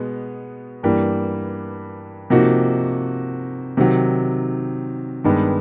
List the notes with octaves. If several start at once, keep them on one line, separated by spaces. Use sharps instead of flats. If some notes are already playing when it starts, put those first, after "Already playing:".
Already playing: B2 G#3 B3
G2 E3 G3 A#3
C3 F3 A#3 D#4 F#4
C3 D#3 F#3
G2 D#3 G#3 B3